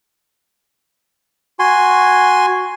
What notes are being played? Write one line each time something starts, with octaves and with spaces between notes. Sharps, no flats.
F#4 G#5 C6